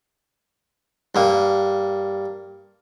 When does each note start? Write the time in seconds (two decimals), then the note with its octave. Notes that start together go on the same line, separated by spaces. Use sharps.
1.15 G2 A#3